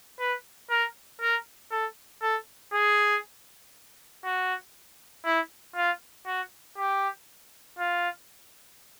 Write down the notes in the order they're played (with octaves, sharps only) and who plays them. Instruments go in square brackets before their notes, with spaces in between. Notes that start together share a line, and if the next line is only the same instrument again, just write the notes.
[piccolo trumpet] B4
A#4
A#4
A4
A4
G#4
F#4
E4
F4
F#4
G4
F4